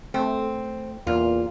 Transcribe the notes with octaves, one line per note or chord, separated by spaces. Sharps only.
A3 C4
E2 A#2 F4